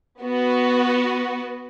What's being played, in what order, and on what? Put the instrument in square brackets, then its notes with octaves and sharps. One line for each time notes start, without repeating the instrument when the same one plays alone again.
[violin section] B3 F#4 B4